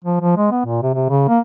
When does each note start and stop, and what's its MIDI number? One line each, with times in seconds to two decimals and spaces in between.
0.04 0.20 53
0.21 0.36 53
0.37 0.50 56
0.51 0.62 59
0.66 0.82 46
0.83 0.91 48
0.94 1.08 48
1.09 1.25 49
1.28 1.40 58